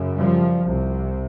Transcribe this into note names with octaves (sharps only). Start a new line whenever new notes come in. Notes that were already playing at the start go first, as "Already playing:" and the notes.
Already playing: F#2 C#3
F3 G3
C2 C3